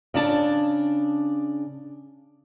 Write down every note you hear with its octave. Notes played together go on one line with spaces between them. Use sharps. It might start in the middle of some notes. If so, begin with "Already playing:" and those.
C#3 D4 A5